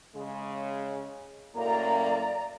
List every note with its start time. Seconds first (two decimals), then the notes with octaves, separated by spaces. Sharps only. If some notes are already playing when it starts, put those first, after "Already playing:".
0.15 C#3 G#3
1.55 F#2 A2 A#3 D5 A#5